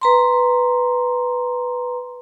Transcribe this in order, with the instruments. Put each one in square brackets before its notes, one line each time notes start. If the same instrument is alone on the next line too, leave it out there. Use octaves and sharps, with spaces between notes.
[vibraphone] B4 A#5 C6